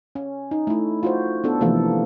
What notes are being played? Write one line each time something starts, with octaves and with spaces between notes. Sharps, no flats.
C#4
D#4
A3 E4
F4 F#4 C5
B3 D4 A4
C3 E3 F3 A3 A#3 A4